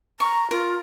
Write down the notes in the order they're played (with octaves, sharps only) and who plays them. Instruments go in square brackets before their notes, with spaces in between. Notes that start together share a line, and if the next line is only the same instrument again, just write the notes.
[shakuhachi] A#5 [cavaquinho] C#6
[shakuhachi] F4 [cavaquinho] A#4